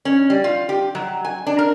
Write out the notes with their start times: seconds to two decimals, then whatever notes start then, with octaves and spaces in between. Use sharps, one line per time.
0.05 C#4
0.30 G3
0.44 F4
0.69 G4
0.95 F#3
1.25 G#5
1.47 D4
1.59 A#4